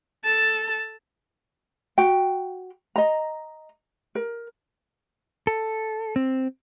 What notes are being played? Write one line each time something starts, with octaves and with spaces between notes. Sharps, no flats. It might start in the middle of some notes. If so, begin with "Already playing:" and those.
A4 A5
F#4 G5
D#5 A#5
A#4
A4
C4